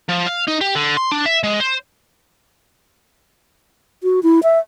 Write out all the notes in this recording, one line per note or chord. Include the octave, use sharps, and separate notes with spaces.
F3
F5
D#4
G4
D3
C6
D4
E5
G#3
C5
F#4
E4
E5